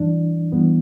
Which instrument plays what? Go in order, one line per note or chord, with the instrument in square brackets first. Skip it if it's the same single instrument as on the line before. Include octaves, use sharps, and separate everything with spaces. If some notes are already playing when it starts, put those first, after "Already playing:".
Already playing: [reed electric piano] G2 E3 D4
G2 E3 B3